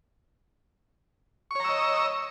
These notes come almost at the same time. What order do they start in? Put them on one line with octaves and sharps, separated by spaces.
C#6 C#5 A#5 E6 D#5